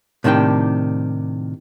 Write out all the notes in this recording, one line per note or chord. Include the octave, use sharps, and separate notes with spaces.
A2 C3 D#3 D4 G5